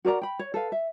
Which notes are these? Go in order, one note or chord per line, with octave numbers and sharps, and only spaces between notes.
F#4 A#4 D5 A#5
G5 B5
C#5
A4 B4 F5
E5